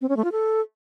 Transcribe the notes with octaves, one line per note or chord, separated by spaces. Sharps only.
C4
C#4
A3
F4
A4